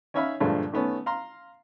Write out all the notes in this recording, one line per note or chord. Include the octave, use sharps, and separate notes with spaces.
C#4 D#4 C#5 E5 F5 B5
G2 A#2 D3 F3 G#3 A3
D#3 A3 B3 C#4
F5 A#5 C6